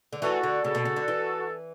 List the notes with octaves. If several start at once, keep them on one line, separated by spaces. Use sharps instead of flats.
D3
E3 F#4 A4
D3
C#3 F#4 A4
B2
C#3
D3
E3